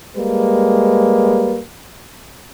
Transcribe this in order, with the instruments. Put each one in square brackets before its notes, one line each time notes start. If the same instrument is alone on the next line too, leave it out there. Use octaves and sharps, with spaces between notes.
[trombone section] G3 G#3 A#3 B4